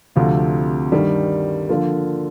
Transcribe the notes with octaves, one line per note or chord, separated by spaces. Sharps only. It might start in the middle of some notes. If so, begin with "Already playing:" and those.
D2 C3 F3 C4 F4
G2 D#3 G3
D3 F3 A#3 F4